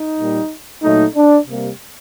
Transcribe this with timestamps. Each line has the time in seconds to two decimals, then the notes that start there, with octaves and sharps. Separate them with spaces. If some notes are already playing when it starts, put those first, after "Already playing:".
Already playing: D#4
0.17 A#2 G3 A#3
0.82 A#2 F#3 A3 D#4
1.14 D4
1.47 C3 G3 A#3